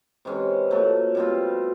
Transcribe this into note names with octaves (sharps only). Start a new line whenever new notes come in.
C3 E3 G#3 C#4
A#2 F#3 A3
B2 G3 C4 F4